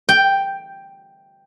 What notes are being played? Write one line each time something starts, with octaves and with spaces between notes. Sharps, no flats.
G5